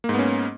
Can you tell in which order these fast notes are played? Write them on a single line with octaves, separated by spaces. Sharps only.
A#3 G#2 B3 C#4